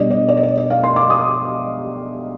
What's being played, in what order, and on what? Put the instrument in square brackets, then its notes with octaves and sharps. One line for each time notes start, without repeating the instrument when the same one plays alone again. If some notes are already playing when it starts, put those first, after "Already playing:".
Already playing: [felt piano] B2 G3 D4 D5 D#5
D5
D5
D#5
D5
D#5
F5
C6
D6
D#6